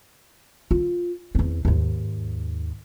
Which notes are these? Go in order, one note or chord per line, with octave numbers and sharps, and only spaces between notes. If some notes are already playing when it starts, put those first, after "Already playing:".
F4
E2 C4
D#2 G#2